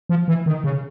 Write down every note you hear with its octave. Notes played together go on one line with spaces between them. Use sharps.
F3
E3
D#3
C#3